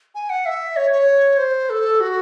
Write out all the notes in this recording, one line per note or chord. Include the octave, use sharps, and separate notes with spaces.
G#5
F#5
E5
C#5
C#5
C5
A4
F#4